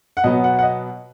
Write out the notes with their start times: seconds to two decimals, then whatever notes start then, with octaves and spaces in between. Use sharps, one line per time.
0.17 F#5
0.24 B2 F#3 B3 D#5
0.44 F#5
0.59 F#5
0.63 D#5